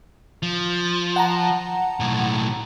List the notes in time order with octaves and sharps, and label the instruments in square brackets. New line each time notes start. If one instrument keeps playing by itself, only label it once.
[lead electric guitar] F3
[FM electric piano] F#5 A5 A#5
[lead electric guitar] B1 A2